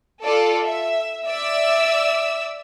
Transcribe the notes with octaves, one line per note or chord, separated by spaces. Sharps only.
F4 A4 D5
E5
D5 E5 E6